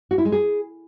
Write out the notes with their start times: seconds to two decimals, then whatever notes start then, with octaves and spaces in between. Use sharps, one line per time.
0.11 F#4
0.18 E4
0.25 G#3
0.32 G#4